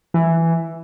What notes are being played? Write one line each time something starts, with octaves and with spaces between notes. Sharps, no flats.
E3